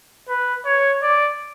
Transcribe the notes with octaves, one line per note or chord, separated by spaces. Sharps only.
B4
C#5
D5